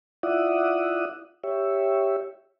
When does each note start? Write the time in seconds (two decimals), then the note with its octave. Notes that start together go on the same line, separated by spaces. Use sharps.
0.23 E4 F4 D5 E5 F#5 D#6
1.44 G4 C#5 E5